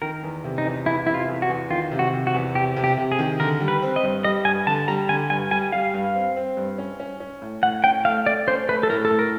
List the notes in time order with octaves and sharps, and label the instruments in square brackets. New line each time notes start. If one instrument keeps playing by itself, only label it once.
[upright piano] D#3 [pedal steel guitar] A#4
[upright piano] E2
C3
[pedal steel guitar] D#4
[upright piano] E2
[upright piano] E2 [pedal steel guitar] E4
[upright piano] C3 [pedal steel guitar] E4
[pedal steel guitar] F4
[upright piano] E2
[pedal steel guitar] F#4
[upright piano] E2
[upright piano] D#3 [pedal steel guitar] F4
[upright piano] C3
[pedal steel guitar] F#4
[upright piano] C3
[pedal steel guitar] F#4
[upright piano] E2
[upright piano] C3 [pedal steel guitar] G4
[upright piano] C3
[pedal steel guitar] G4
[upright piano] C3
[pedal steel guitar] G#4
[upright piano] D#3
[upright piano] D3 [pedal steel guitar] A#4
[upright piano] G3
[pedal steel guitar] B4
[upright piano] C4
[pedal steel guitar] D#5
[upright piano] G2
[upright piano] G3 [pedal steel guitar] D#5
[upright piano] G2 [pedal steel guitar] G#5
[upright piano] D3 [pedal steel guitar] A5
[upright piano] G3 [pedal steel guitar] A#5
[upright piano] D3 [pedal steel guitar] G#5
[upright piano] G2 [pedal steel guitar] G#5
[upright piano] G3 [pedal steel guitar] G#5
[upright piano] G3 [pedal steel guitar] F5
[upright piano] G2
C4
C4
G2
C#4
C#4
C#4
A2
[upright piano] A2 [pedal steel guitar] F#5
[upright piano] C#4 [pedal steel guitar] G5
[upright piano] A3 [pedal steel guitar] F5
[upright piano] A3 [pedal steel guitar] D5
[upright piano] C#4 [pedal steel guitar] C5
[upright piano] A3 [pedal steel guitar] B4
[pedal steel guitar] A4
[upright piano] A2 [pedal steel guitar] A#4
[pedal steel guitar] A4
[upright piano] A2
[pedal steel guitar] A#4